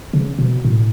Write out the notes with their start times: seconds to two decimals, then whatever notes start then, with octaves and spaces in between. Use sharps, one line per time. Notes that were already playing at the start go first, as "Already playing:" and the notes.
0.13 C#3
0.39 B2
0.65 A2